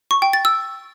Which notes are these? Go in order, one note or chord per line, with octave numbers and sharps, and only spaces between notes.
C#6
G5
A6
E6